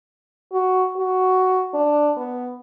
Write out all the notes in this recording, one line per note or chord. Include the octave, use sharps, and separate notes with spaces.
F#4
F#4
D4
B3